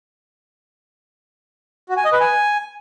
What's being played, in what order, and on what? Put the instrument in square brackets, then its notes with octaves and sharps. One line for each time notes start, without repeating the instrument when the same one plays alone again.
[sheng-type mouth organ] F#4
G#5
D#5
B4
G#5